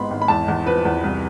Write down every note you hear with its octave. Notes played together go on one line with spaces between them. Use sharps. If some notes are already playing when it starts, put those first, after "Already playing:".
Already playing: G#1 G#2 B3 B5 C6
G#1
B5
E2 A5
E2
F3 B4
E2
C2